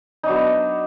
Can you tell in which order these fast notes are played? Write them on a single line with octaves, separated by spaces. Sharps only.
D#4 D4 F#3 B3